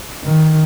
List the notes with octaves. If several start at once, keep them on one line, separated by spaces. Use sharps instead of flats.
D#3